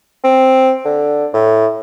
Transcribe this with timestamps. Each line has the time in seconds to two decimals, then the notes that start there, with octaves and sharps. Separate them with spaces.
0.24 C4
0.85 D3
1.34 A2